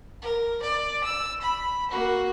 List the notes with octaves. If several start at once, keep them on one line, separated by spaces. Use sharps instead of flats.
A#4
D5
E6
B5
A#3 F#4